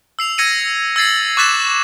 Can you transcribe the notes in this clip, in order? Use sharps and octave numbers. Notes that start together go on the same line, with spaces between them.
E6 C7 F7
E6 G#6 A#6 C#7 D#7
E6 G#6 A6 C7 F#7
C#6 D6 F#6 A6 B6 E7